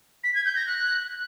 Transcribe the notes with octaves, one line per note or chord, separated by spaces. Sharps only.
B6
G#6
G6
A#6
F#6